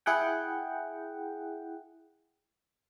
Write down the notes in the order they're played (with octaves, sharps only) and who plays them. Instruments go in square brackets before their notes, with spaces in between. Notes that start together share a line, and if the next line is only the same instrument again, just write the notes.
[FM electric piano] E4 G#4 F#5 G5